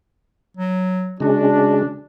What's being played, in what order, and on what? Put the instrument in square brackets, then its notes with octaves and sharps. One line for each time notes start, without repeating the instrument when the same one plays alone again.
[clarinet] F#3
[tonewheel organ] C#3 G#3 [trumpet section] D4 [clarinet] F#4